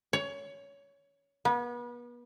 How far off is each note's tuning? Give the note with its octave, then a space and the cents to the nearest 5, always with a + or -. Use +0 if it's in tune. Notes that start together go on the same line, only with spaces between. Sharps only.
C#5 +20
B3 -35